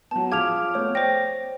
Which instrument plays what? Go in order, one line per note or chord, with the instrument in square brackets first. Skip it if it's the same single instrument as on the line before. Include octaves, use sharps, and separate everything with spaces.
[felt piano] F#3 B3 [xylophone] A5
[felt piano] F3 G#4 [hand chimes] F5 D6 F6 [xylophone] G#6 F7
[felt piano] A3 B3 [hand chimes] C#5
[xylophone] C5 G5 [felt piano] D5 [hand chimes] A#6